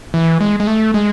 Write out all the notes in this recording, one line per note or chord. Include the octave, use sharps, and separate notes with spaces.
E3
G#3
G#3
A3
G#3